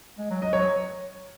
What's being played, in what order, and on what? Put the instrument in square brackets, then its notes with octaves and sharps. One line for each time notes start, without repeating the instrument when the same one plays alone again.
[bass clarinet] G#3
F#3
[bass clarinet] F#3 [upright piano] D#5
[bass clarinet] F#3 [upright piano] C#5